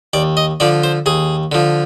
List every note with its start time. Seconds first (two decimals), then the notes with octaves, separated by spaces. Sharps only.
0.13 D#2 D5
0.37 D#5
0.60 D3 F3 D5
0.84 C5
1.06 D#2 G#4
1.52 D3 F3